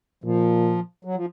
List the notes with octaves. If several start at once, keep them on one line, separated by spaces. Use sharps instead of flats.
A#2 F3
F#3
F3